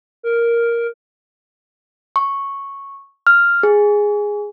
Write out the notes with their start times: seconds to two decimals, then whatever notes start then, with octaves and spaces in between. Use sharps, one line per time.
0.23 A#4
2.16 C#6
3.27 F6
3.63 G#4